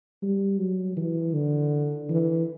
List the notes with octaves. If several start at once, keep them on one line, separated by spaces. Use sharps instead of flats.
G3
F#3
E3
D3
E3